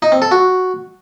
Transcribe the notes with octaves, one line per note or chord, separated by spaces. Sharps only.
D#4
C4
A4
F#4